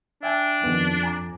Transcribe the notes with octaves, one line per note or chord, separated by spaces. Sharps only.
D4 E5 G5 G#5
F2 D#3 B3
G#5 A#5 D6